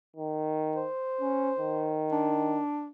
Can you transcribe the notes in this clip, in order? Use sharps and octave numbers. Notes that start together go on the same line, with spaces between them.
D#3
C5
C#4
D#3
D4